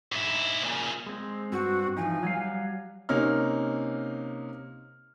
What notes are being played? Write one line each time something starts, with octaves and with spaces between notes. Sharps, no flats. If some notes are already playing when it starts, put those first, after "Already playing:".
G#2 E4
A#2 C#3
G#3 C4
G2 C4 F#4
E3 F3 D#4 G#5
F#3 G3 F5
C3 A#3 C#4 D#4 F6